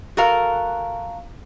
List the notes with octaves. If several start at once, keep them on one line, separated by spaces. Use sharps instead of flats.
F#4 A4 A#4 F5